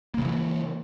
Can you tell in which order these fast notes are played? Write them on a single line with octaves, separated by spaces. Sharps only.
A#3 C#3 E3